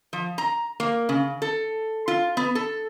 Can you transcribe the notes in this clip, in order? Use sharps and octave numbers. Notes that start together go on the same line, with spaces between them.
F3
A#5
A#3
C#3
A4
F4
B3
A4